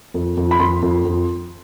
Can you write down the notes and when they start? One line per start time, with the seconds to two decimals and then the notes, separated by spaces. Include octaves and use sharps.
0.14 F2
0.37 F2
0.51 B5
0.60 F2 C6
0.82 F2
1.05 F2